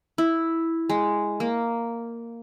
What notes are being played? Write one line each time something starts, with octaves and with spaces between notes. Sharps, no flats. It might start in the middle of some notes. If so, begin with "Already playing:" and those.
E4
G#3
A#3